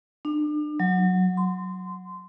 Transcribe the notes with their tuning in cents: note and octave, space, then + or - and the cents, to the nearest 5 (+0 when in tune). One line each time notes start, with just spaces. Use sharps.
D4 +35
F#3 -5
C6 -15